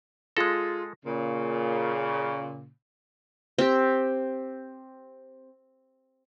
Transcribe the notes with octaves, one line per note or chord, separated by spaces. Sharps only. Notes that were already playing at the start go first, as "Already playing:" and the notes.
G#3 F4 G#4 A4 A#6
A#2 C#3
C4 G4